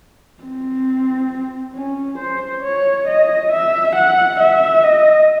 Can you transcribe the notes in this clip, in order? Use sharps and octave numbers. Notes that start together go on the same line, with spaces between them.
C4
C#4
C5
C#5
D#5
E5
F#5
E5
D#5